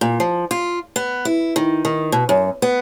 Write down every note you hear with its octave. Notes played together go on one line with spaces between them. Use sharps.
A#2
F3
F4
B3
E4
D#3
D#3
B2
F#2
B3